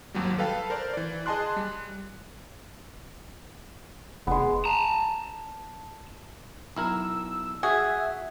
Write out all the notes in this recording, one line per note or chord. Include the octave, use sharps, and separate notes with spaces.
G#1 D#2 F#3 G3
A4 B4 F5 G5 A5
A#4 C5 D5
E3 D5
G#4 D#5 G#5 A5 C6 F#6
G3
F1 G#3 B3
A5 A#5
B1 E4 A#4 E6
F#4 G#4 E5